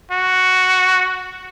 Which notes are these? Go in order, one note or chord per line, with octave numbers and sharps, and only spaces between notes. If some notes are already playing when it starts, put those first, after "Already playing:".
F#4